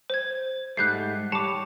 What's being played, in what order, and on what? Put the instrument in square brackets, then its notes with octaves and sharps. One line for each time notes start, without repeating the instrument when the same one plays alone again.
[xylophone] C5 G#6
[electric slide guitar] G#2 G3 A3 [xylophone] F#6 G6 C7
[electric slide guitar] G3 C#5 [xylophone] A5 D6